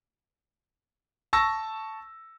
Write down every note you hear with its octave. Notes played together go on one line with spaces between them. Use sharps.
A5 C#6 E6 A#6